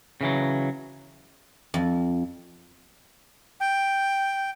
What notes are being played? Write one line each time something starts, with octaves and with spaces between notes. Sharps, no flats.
C#3 E3 F#3
F2
G5